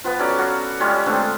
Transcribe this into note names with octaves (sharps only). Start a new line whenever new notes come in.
F3 B3 B4
F#3 C#4 A4 D5
F#4 F5
G3 G#3 C#4 F4
D3 G#3 A3 C4